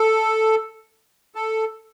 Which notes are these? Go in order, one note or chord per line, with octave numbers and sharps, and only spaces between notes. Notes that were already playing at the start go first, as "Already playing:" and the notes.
Already playing: A4
A4